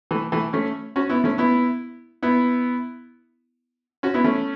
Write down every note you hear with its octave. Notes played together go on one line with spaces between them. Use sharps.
E3 A3
E3 A3
A3 C#4
C#4 F#4
B3 E4
A3 C#4
B3 E4
B3 E4
C#4 F#4
B3 E4
A3 C#4